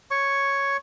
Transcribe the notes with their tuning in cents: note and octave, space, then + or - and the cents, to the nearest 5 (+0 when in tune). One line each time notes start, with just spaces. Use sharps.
C#5 +0 C#6 +0